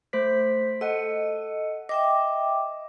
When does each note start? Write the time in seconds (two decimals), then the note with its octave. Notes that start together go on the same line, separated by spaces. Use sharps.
0.13 A3 C5 B6
0.81 A4 D#5 F#5
1.89 D#5 E5 G5 D6